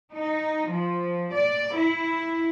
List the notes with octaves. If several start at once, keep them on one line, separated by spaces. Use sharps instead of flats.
D#4
F3
D5
E4